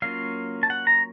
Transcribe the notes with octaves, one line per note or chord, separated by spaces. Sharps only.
F#3 A#3 C#4 F4 F5
A5
F#5
A#5